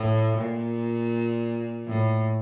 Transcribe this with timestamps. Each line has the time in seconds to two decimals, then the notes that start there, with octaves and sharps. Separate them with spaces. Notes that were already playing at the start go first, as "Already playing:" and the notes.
Already playing: A2
0.38 A#2
1.88 A2